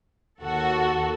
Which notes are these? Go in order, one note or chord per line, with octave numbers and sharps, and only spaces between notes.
D#2 F#4 A4